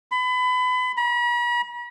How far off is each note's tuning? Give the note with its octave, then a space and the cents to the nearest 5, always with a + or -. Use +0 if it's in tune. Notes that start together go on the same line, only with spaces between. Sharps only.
B5 +30
B5 -45